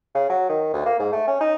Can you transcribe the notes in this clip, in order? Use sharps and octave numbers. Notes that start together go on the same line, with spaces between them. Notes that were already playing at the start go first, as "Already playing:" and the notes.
C#3
F#3
D#3
D2
A#3
G#2
A3
C#4
D#4